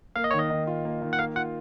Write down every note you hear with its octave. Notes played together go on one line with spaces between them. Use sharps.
A#3 F5
D#5
C#5
D#3
D#5
D#3
F4
A#3
D#3
F#5
A#3 F5
F4 F#5